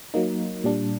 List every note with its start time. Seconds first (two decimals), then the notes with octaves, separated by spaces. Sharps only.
0.14 F#3 A#3 D#4
0.64 A#2 G3 D4